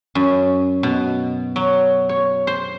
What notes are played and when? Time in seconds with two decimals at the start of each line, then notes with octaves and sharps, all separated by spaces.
0.15 F#2
0.83 B2
1.56 F#3
2.09 C#5
2.47 C5